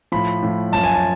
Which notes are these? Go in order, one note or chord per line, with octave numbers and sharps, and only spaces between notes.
A2 F3 B5
A2 F3
F#2 F3 A5
G#5
A5